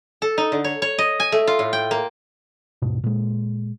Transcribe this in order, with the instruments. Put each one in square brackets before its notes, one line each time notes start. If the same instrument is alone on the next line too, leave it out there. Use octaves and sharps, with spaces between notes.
[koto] A4
D#4
D3
C#5
C#5
D#5
G#5
A3
F4
A2
G5
A#3
[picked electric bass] D#1 G#2 B2
A#2 G#3